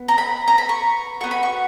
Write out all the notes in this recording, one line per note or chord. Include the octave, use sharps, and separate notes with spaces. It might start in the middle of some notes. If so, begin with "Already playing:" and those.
Already playing: B3
A#5
B5
A#5
B5
C#6
B3 F#4 C#6
B5
C#6